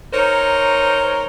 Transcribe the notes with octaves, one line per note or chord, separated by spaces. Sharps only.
D#4 A#4 C5 C#5